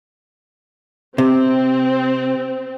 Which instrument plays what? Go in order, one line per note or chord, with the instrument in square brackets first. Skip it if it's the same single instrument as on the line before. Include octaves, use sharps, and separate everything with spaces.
[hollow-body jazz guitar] C3 [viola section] C4